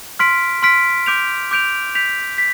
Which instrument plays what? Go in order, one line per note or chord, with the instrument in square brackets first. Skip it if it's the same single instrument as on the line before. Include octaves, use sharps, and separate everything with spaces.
[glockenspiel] C6 F6 B6 D7
C6 F6 B6 D7
D6 G6 D7 F7
D6 G6 D7 F7
G6 B6 F7
B6